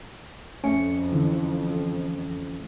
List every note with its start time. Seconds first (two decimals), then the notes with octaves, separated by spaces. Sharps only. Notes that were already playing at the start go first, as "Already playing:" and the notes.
0.64 F2 A3 C#4 C#7
1.12 D3 E3